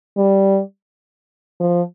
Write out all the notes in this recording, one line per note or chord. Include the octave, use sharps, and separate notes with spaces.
G3
F3